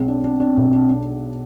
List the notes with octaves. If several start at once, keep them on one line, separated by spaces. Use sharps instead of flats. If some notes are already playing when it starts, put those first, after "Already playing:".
Already playing: B1 G#3 C4
D4
D4
D4
B1
D4
D4